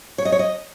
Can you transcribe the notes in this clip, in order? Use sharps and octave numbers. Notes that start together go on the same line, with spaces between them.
C#5
D#5
C#5
D#5